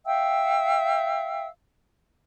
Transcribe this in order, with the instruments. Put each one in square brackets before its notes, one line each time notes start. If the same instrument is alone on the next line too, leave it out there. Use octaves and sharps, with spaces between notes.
[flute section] E5 F5 G5 E6